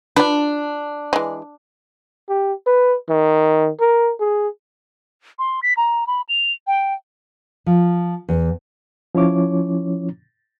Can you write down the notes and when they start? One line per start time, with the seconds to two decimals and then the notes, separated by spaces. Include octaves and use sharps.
0.16 D4 F4 B4
1.13 E3 G#3
2.29 G4
2.67 B4
3.09 D#3
3.80 A#4
4.20 G#4
5.39 C6
5.63 B6
5.77 A#5
6.07 B5
6.29 F7
6.67 G5
7.66 F3
8.29 E2
9.15 F3 C#4 E4 C#5 D6